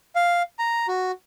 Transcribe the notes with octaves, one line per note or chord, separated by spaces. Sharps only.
F5
A#5
F#4